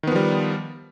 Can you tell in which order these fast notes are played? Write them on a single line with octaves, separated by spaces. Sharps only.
D#3 B3 F3 G3